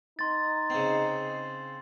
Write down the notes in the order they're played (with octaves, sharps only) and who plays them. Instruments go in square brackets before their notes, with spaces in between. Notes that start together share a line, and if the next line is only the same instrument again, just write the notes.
[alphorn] D#4 [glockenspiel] C6 A6
[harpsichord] C#3 C4